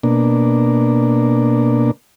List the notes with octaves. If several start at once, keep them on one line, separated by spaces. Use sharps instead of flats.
B2 A#3 D4